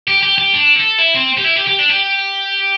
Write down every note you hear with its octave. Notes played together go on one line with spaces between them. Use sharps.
G4
G4
G4
D4
A4
E4
C4
G4
E4
G4
G4
D4
G4